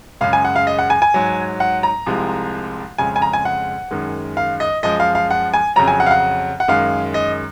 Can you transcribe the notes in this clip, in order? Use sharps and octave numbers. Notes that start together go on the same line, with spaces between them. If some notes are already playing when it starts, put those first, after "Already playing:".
F#2 C#3 G#3 F5
G#5
F#5
F5
D#5
F#5
G#5
G#5
G#2 F#3
F#5
A#5
C2 C3 F3 G#3
F2 C#3 G#3 G#5
G#5
A#5
G#5
F#5
F#2 D#3 G#3
F5
D#5
F#2 F3 G#3 D#5
F5
F5
F#5
G#5
F2 C#3 F#3 A#5
G#5
F#5
F5
F#5
F#5
F#2 D#3 G#3 F5
D#5